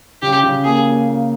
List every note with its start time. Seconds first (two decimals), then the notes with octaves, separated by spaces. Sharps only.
0.22 C#3 G4
0.44 C#3
0.65 A#3 G#4
0.86 A#3
1.08 A#3